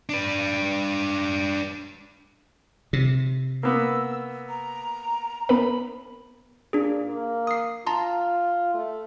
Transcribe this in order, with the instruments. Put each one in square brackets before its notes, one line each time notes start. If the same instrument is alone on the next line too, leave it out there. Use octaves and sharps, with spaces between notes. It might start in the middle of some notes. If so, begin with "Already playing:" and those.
[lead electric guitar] D4 B4
[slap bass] C3
[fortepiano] A#3 B3 [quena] E6
[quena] A#5
[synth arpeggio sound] B3 A#4 B4 [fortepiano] B5
[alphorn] A#2 [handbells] D4 G#4
[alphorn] A#3
[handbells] D#6 C7
[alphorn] F4 [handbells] A5 A#5 C6
[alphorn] A3